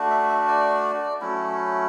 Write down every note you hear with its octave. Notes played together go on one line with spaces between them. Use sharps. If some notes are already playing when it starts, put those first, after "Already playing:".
Already playing: A3 D4 F#4
E5
E5
D5
F#3 A3 C#4 E4